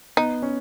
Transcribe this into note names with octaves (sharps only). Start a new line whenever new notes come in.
B3 D#4
C#4